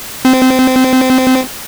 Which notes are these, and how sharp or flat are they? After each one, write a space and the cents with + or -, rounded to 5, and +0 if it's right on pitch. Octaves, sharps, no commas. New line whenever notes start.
C4 -20